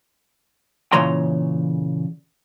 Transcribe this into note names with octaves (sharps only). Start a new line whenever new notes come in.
A#2 C#3 E3 C#5 A#5 C6